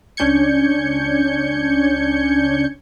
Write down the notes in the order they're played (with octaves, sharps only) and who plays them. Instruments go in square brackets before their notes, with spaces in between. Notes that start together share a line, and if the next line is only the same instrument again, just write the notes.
[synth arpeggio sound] C#2 C#4 D4 G6 G#6 C#7